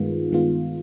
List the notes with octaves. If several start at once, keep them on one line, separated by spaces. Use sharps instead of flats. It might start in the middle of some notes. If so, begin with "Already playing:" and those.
Already playing: G2 D#3 G#3 B3 F4
G2 D#3 G#3 B3 F4